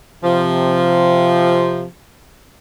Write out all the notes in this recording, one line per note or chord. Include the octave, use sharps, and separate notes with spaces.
C3 F3